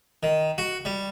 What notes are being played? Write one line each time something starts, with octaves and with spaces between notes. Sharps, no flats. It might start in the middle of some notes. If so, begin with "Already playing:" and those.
D#3
F#4
G3